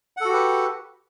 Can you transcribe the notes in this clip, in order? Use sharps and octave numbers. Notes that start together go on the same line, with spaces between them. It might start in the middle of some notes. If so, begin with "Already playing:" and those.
F#4 G4 A4 B4 F#5